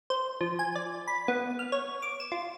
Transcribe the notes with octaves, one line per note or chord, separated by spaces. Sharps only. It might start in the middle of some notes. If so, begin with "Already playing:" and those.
C5
F3
G#5
D5
B5
B3
F6
C#5
D6
E7
F4